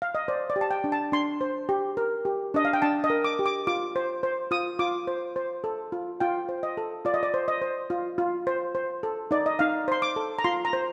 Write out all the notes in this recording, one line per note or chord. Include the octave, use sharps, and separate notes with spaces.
F5
D#5
C5 D5
D5
G4
A5
G5
D4
A5
D4 C6
C5
G4
A#4
G4
D4 D#5
F5
G5
D4 A5
D#5
A#4
D6
G4
D6
F4 D6
C5
C5
F4 D#6
F4 D6
C5
C5
A4
F4
F4 G5
C5
D#5
A4
F4 D5
D#5
D5
C5
D#5
C5
F4
F4
C5
C5
A4
D#4 D5
D#5
D#4 F5
C5 C6
D6
A4
A#5
F4 C6
A#5
C5